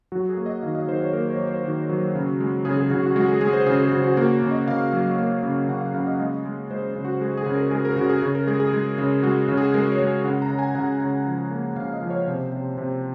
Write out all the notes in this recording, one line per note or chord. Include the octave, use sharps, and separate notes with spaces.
F#3 F#4
G#4
A#3
D#5
D#3 F5
D#5
D#3 C5
C#5
A#3 A#4
C#5
F#3
C5
D#3 F#4
F#3
C#3
G#3
C#3 G#4
G#4
C#3 F#4
F#4
G#3 F#4
G#4
G#3 G#4
C5
C#3 G#4
G#4
C#3 F#4
F#4
A#3 F#4
C#3
D#5
C#3 F5
F#3
A#3
C#3
C#3 F#5
F5
C#3 F5
D#5
G#3 D#5
G#3
G#3 C5
C#3
F#4
G#3 G#4
G#4
C#3
A#4
G#3 G#4
A#4
C#3 F#4
G#4
C#3
A#4
G#3 G#4
G#4
G#3
C#3
G#3 F#4
C#3
G#4
G#3 A#4
C#5
G#3
C#3 F#5
A#5
C#3
G#5
C#3 F#5
C#3
F3
A#3
C#3 F5
D#5
F3
C#5
C3 C5
C3
C3